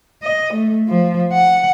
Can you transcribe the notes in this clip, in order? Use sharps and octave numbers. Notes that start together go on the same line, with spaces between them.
D#5
A3
F3
F#5